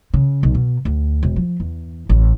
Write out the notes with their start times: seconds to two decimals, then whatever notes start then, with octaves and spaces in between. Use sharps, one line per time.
0.14 C#3
0.43 B1
0.55 B2
0.85 D2
1.23 E1
1.36 F3
1.60 E2
2.09 A1